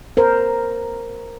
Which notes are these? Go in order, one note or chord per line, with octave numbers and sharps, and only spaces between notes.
A#4 C5